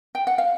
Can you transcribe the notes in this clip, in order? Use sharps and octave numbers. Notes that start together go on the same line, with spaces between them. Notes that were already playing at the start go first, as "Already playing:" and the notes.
G5
F#5
F5